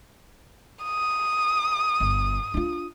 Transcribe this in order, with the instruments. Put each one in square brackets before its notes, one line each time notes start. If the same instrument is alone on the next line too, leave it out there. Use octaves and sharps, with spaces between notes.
[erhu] D#6
[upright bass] G1
D4 F4